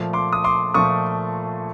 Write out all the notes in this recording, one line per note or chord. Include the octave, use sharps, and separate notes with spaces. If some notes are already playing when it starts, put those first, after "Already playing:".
Already playing: A#2 F3 A3
C6 D6
D#6
C6 D6
A#2 F3 A3 C#6 D#6